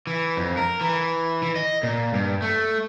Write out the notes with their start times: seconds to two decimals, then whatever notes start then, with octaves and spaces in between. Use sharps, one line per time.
0.07 E3
0.37 F2
0.57 A#4
0.81 E3
1.43 E3
1.56 D#5
1.83 A#2
2.14 G2
2.42 A3